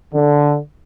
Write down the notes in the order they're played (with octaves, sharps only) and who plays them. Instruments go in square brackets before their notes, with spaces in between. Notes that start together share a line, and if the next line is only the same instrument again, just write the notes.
[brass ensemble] D3